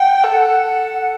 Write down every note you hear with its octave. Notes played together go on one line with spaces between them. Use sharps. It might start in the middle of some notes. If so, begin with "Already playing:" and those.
Already playing: F#5 G5
A4